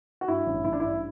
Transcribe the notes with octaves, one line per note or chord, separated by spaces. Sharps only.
F#4
G2 E4
A1
A1 E4
D4
G2 E4